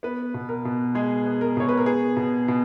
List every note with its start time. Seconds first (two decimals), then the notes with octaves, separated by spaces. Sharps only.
0.03 B3 B4
0.34 B2
0.49 A#4
0.65 B2
0.95 G#3 G#4
1.26 B3
1.41 A#4
1.57 B2 C#5
1.69 B4
1.77 A#4
1.86 B3 G#4
2.17 B2
2.48 B2